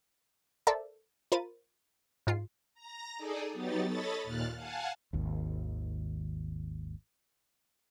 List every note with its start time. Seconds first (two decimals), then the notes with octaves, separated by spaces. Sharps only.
0.67 A4 A#4 C5 D5 E5 A5
1.32 F4 A#4 C5 B5 A6 D#7
2.27 G#2 F4 C7
2.74 A#5 A#6
3.17 D#4 G#4 A4 D5 D#5
3.53 F#3 B3 D#4 G4 A6
3.85 A4 C#5 D#5 B5 A6
4.24 D#2 A#2 F6 F#6 A6
4.55 F5 F#5 G#5 A5
5.13 G#1 D#2